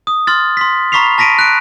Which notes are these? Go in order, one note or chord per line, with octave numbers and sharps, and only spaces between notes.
D#6
C6 F6 A6
C6 B6
A#5 B5 C#6 B6 C7 F7
A5 A#6 B6 D7 D#7
F#6 D7